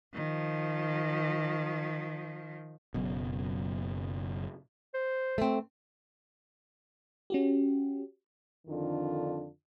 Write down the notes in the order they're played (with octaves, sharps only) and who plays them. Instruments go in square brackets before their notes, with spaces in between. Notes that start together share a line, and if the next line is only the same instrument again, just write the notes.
[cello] D#3 F3
[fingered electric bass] F#1 F#2 B2
[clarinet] C5
[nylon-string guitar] A3 C4
[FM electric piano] C#4 F#4 G4
[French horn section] F2 D3 D#3 D4 F4